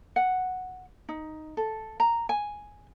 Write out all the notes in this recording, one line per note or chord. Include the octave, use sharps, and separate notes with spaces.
F#5
D#4
A4
A#5
G#5